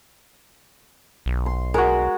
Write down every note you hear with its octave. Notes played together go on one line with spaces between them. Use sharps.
B1
C6
G#3 F#4 A#4